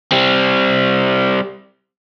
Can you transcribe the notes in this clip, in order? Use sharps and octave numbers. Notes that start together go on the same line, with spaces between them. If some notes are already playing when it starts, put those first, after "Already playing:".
G3 C4